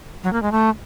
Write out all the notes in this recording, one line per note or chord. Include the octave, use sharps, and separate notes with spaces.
F#3
A#3
G#3
A3